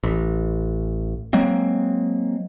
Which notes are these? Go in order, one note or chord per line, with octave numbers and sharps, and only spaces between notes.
A1
F#3 G#3 A#3 C4